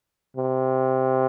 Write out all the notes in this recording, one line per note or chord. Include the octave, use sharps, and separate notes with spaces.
C3